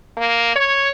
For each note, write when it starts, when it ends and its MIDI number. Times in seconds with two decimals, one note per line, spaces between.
0.17 0.54 58
0.55 0.91 73